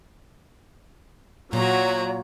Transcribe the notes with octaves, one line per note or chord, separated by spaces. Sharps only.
A#2 F#3 F#4 C#5 A#5